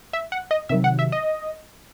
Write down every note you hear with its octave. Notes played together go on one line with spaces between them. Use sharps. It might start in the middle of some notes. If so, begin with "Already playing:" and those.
E5
F#5
D#5
C3 D#3 F#3 E5
F#5
E5
D#5